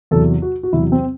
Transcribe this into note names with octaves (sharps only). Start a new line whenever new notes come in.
E2 C3 F#3 A4
F#4
F#4
E2 C3 F#3 E4
C4